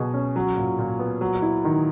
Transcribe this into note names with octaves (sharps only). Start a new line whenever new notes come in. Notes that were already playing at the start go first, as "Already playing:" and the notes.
Already playing: B2 F#3 G#4
C#4
F#3
A#2
A#2
B3
F#3
E4
D#3